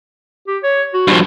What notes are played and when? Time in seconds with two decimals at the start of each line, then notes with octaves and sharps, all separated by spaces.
0.48 G4
0.63 C#5
0.94 F#4
1.08 G2 F3